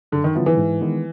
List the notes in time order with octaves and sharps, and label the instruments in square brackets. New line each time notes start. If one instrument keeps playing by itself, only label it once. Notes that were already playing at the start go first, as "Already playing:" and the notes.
[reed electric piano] F#2 [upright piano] D3
[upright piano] D#3
[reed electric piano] D3 F#3 B3 E4 [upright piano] F3
[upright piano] E3
[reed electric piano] G#2
D#3 G#3 B3